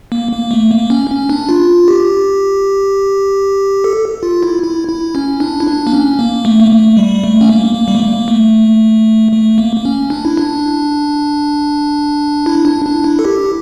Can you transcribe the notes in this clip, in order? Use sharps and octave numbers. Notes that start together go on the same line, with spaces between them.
A#3
A#3
A3
A#3
C#4
C#4
D4
F4
G4
A4
F4
E4
E4
E4
C#4
D4
E4
D4
A#3
C#4
A#3
A3
A#3
A3
G3
A3
C#4
A#3
A#3
G3
A3
A#3
A3
A3
A#3
A#3
C#4
D4
E4
D4
E4
D4
D4
E4
A4
G4